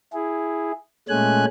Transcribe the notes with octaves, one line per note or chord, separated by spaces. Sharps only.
E4 G#4
A#2 G#3 A3 C#4 G#5 F#6